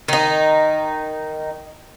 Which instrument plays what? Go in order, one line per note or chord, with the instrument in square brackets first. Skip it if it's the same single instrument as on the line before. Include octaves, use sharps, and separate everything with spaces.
[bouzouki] D#3 D#4